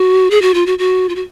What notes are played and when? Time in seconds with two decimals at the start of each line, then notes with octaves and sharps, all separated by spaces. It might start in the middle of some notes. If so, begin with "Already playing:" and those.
Already playing: F#4
0.30 G#4
0.42 F#4
0.54 F4
0.66 F#4
0.78 F#4
1.09 F4
1.15 F#4